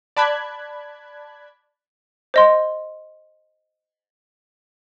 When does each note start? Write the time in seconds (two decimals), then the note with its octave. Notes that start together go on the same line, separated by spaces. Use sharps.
0.17 D5 A5 B5 F#6 G#6
2.34 C5 D#5 C6